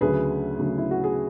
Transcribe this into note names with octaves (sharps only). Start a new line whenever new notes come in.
D2 C#3 F#3 A3 G#4 B4
D2 C#3 F#3 A3
E4
F#4
G#4